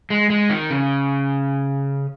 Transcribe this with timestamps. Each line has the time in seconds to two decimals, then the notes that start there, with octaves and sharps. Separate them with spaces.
0.10 G#3
0.30 G#3
0.50 D#3
0.70 C#3